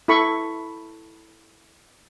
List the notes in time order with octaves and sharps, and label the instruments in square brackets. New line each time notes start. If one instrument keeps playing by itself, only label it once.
[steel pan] E4 A4 B5 C#6